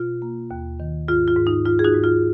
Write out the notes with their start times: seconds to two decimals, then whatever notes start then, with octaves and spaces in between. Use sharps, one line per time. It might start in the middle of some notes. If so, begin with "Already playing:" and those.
Already playing: B2 F4
0.22 A#3
0.51 D#2
0.80 D#3
1.08 G#2 F4
1.28 F4
1.36 G#2
1.47 D#4
1.66 G#2 F4
1.79 G#4
1.84 D#4 F#4
1.94 G#2
2.04 F4